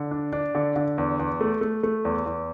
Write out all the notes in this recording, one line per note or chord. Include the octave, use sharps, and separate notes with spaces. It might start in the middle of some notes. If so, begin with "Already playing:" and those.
Already playing: D3
D4
D4
D3
D3
E2
E2
A3
A3
A3
E2
E2